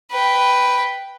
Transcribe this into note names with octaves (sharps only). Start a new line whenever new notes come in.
B4 G5